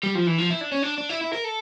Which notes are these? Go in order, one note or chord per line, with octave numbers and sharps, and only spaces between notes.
G3
F3
E3
F3
E4
D4
C#4
D4
D4
E4
E4
A#4
A4